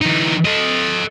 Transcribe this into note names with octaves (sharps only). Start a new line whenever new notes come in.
E3 D#4
A4 D#5